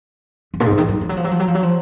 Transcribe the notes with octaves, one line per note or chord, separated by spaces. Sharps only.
F#2
A#2
G#2
C#3
D#3
F#3
F3
F#3
F3
F#3
F3
F#3
F3
F#3
F3